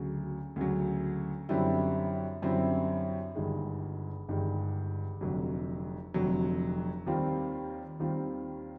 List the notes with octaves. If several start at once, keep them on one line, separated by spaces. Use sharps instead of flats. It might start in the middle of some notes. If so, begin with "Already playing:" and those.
Already playing: D2 C#3 F#3
D2 C#3 F#3
F#2 D3 G3 C4 E4
F#2 D3 G3 C4 E4
G1 G2 D#3 G#3
G1 G2 D#3 G#3
F1 F2 D3 F#3
F1 F2 D3 F#3
D#2 D#3 G3 C4 F4
D#2 D#3 G3 C4 F4